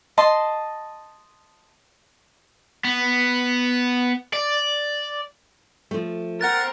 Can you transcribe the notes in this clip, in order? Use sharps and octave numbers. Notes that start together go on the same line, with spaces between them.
D#5 A5 C6
B3
D5
F3 A3
C4 A#4 F#5 F#6 A6